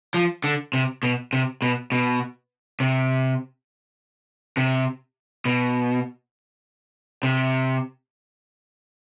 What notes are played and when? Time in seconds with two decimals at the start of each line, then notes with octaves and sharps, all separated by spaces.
0.14 F3
0.44 D3
0.73 C3
1.03 B2
1.33 C3
1.62 B2
1.92 B2
2.80 C3
4.57 C3
5.45 B2
7.23 C3